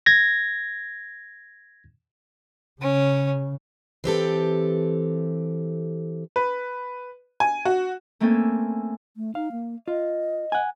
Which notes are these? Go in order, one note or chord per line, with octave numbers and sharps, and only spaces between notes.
G#6 A#6
C#3 C#4
E3 C4 G4 A4
B4
G#5
F#4
A3 A#3 C4 C#4 A4 G#5
A3
D#4 F5
A#3
F4 D#5
F#5 G#5